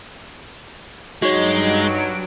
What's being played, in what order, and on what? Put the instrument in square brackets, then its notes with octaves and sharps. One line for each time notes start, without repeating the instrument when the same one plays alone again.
[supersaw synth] G2 F#3 D7 [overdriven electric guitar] G#3 [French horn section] D#4 [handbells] F#4 C#5